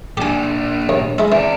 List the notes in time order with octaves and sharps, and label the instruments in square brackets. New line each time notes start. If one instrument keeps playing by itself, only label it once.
[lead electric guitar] A#2 D4 [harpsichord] G4 G#5
[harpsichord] D#2
G#3 E4
[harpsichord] E3 [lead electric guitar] C4 D5